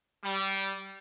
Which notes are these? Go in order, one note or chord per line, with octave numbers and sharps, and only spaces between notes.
G3